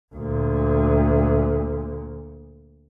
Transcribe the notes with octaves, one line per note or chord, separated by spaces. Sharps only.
D2 A#2